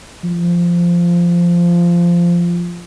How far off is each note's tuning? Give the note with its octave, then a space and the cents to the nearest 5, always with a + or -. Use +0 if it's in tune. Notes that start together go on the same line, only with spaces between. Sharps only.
F3 -10